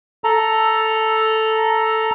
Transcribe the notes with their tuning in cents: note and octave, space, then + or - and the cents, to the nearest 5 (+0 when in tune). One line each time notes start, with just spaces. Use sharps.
A4 +0 A#5 +0